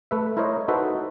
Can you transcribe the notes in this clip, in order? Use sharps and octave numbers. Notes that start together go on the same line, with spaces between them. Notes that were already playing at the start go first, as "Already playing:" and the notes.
A3 B4 E5
E4 A#4 C5 C#5 D#5
D#4 F#4 A4 B4 C5 E5